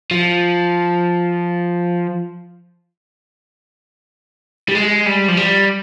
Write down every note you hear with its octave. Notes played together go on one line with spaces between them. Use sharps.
F3
G3
G#3
G3
F3
G3